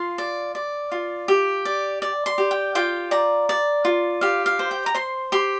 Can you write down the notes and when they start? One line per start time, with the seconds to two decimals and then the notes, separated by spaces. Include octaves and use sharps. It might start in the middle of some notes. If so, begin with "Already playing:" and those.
Already playing: F4 C6
0.18 D5
0.55 D5
0.92 F4
1.28 G4
1.65 D5
2.02 D5
2.26 C6
2.38 G4
2.51 G5
2.75 F4 G5
3.11 D5 A#5
3.49 D5
3.85 F4
4.21 G4 F5
4.46 F5
4.59 C5
4.71 G5
4.86 A#5
4.94 C5 C6
5.32 G4 C6